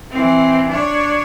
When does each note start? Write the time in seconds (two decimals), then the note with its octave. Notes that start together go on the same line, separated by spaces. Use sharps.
0.12 E3 C4
0.68 D4 C#5